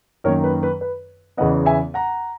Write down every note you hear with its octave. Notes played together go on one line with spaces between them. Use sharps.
F#2 D#3 A#3 A#4 C#5
B4
B4
B4
E2 C#3 E3 B3 D#5 F#5
E5 G#5
F#5 A#5